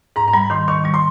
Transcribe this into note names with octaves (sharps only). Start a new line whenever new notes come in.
G#2 A#5
A#5
G3 B5
D#3 C6
D#3 C#6
G3 C#6
C6